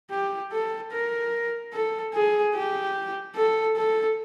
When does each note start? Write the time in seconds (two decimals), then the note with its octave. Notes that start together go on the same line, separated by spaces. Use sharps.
0.11 G4
0.52 A4
0.92 A#4
1.73 A4
2.14 G#4
2.55 G4
3.36 A4
3.76 A4